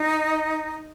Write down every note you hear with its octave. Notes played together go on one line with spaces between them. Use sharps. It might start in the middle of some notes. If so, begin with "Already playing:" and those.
Already playing: D#4